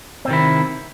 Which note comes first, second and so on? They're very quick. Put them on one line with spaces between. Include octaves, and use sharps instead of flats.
C4 C3 D#3 E4